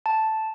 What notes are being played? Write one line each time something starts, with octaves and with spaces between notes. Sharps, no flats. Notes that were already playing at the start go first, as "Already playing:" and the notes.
A5